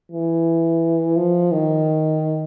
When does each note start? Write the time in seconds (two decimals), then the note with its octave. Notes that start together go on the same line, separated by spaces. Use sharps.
0.12 E3
1.16 F3
1.52 D#3